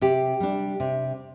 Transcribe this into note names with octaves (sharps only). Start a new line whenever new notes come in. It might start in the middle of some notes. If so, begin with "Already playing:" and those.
C3 G4
G3 D4
C3